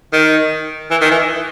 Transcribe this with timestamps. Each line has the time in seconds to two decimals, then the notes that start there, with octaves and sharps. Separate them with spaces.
0.13 D#3
0.91 E3
1.01 D#3
1.11 E3